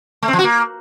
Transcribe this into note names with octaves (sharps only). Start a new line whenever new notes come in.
A3
C4
F3
F#4
A#3